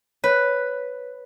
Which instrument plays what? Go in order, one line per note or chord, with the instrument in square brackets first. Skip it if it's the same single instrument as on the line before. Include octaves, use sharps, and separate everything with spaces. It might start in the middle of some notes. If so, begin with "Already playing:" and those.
[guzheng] B4 [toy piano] C#5